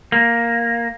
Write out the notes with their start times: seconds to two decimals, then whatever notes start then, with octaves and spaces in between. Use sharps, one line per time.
0.12 A#3